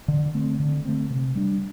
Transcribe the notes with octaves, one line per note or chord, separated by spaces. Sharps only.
D3
A3 C4
D3
A3 C4
C3
G3 D4